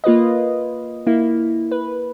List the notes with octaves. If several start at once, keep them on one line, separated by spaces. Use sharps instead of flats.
A#3 F4 B4 D#5
A#3 E4
B4